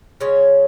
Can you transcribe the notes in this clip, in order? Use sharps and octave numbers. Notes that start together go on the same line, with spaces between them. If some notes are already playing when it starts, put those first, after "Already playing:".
C#3 G#3 C#4 C#5